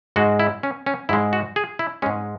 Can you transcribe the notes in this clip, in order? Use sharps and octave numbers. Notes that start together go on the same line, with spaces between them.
G#2 G#3 F#4
E4
C#4
C#4
G#2 G#3 E4
F#4
G#4
E4
G#2 G#3 C#4